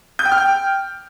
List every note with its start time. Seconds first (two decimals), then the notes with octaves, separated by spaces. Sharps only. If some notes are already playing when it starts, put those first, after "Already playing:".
0.19 G6
0.25 G5
0.32 F6
0.38 G5